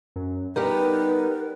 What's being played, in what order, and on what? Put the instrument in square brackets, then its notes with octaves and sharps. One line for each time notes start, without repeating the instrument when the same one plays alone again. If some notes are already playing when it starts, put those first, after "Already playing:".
[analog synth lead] F#2
[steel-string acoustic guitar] G3 B3 G4 [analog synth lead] D#4 [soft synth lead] A#4 [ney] B4